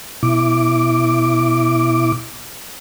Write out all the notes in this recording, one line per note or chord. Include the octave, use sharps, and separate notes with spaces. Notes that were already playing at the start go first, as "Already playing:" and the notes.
B2 E4 D6